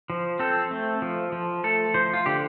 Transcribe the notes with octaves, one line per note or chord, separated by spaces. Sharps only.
F3
C4 A4
A3
F3
F3
A3 A4
F3 C5
F4
D3 G4